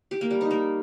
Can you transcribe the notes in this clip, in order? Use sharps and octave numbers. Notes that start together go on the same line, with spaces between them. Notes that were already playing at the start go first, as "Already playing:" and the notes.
G4
A#3
G3
D#4
A#3